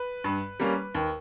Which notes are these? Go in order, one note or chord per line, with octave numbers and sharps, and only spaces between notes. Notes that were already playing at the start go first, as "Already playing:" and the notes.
Already playing: B4
G2
G3 A#3 C#4
D#2